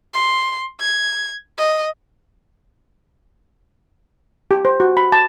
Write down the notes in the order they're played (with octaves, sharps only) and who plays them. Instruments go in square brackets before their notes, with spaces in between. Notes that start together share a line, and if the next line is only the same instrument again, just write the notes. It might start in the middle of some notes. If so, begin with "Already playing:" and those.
[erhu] C6
G#6
D#5
[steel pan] G4
C5
F#4
B5
A5